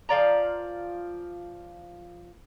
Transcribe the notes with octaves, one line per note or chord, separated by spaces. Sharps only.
F3 F4 D5 A#5